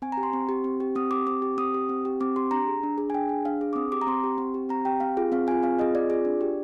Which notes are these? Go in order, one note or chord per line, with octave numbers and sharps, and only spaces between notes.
C4 G#5
A#5
G4
C6
C4
G4
C4
G4
C4 D#6
G4 D6
C4 D6
G4
C4 D#6
G4
C4
G4
C4 D6
G4 C6
D4 A#5
G#4
D4
G#4
G#5
D4 G5
G#4
D4 F5
G#4
D6
C4 D#6
G4 D6
A#5
C4 C6
G4
C4
G4
C4 A#5
G4 G5
C4 F5
F4 G#4
C4 F5
F4 G#4 G#5
C4 F5
F4 G#4 D#5
C4 D5
F4 G#4
D4
G4